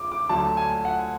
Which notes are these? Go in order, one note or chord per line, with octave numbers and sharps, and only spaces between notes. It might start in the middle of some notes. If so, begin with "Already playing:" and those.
Already playing: F2 C#3 D6
D6
D2 D3 F#3 A3 A5
G#5
F#5